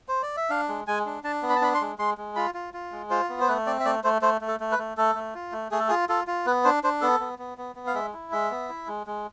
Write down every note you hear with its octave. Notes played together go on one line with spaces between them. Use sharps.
C5
D5
E5
D4 F5
G#3
G#3 G#5
D4
D4 A5
B3
B5
A5
D4 B5
C6
G#3
G#3 C6
G#3
F4 B5
F4
F4
G#3
F4 C5
B3
C5
A3 B4
C4 D5
E5
A3 D5
A3 C5
A3 C5
A3
A4
A3
B4
A3
A3 A4
A3
F4
A3
A3 G#4
A4
F4 G#4
F4 A4
F4
B3 B4
D4 C5
D4 C5
B3 A4
B3
B3
B3
B3
F5
G#3 E5
E4
G#3 E5
B3
E4
G#3
G#3